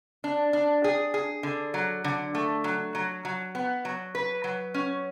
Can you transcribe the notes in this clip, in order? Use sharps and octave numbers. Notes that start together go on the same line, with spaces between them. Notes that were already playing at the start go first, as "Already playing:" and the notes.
D4
D4
G#4
G#4
D3
F#3
D3
A3
F#3
F#3
F#3
B3
F#3
B4
F#3
C#4